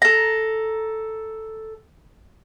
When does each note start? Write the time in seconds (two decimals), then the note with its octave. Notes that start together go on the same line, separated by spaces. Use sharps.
0.02 A4 A#5